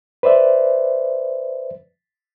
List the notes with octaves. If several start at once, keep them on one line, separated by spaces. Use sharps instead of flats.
B4 C5 D5 E5